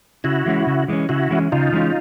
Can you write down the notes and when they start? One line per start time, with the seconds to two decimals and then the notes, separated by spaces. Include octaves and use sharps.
0.24 C#3 E4 F#4
0.46 E3 G#3 C#4
0.67 C#3
0.88 E3 G#3 C#4
1.09 C#3 E4 F#4
1.31 E3 G#3 C#4
1.52 C#3 D#4 F4
1.73 E3 G#3 C#4